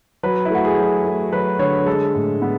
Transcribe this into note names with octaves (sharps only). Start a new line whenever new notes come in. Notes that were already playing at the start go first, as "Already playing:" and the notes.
F#3 B4
E4
A3 F#4
G#4
F#3
A3
F#3 B4
D3 C#5
G#3 A4
A2
B3